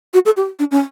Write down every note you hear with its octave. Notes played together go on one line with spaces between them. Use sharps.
F#4
A4
G4
D4
C#4